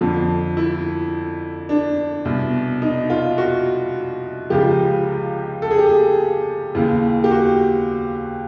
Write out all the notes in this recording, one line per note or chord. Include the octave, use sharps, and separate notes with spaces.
F2 D3 F3
E4
D4
C2 B2
D#4
F4
F#4
C#2 C#3 F3 G4
A4
G#4
G4
G#4
D#2 C#3 E3
G4
F#4